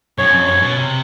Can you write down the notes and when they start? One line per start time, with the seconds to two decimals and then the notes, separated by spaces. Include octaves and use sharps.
0.18 F#2 C#5
0.32 F2
0.47 F#2 C#5
0.62 B2
0.77 C3